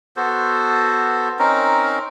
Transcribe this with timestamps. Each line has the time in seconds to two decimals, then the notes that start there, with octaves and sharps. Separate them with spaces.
0.16 B3 F#4 A4 C5
1.39 C4 C#4 D#4 A#4